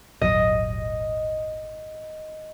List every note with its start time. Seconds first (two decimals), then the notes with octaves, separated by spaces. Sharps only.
0.21 D#1 G#1 F#3 D#5